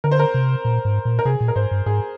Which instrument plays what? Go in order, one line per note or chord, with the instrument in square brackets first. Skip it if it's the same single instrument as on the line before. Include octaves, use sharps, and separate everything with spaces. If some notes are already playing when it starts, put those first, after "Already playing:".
[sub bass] D3 [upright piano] A#4
[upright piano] C5
A#4
[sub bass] C3
A#2
G#2
A#2
[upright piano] A#4
[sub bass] C3 [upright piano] G#4
[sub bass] A#2
[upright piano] A#4
[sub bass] G#2 [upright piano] C5
[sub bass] G2
[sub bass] G#2 [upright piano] G#4